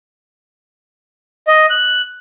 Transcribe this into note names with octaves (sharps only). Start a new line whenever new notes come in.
D#5
F#6